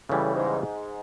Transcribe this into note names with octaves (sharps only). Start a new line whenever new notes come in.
A2 C#3 E3 G3
G#2
G#2